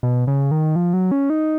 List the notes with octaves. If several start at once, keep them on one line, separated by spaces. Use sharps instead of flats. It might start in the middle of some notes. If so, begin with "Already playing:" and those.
B2
C#3
D#3
F3
F#3
C#4
D#4